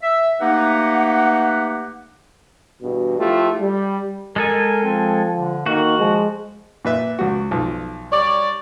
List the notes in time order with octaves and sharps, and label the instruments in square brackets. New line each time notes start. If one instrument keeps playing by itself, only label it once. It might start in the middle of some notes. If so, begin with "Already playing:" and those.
[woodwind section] E5
A3 A#3 D#4 G4 B4 F#5
[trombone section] E2 G2 B2
F3 A3 E4 F4 G4
G3
[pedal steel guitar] G#3 A4 G#5 [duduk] A#4
[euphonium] F3 [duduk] C4
[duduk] D3
[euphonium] D#3 [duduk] A#3 [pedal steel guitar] F#4
[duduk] F3 [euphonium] G#3
[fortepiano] A#2 B4 E5
C#2 F#4
B1 F3
[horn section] G3 C#5 D5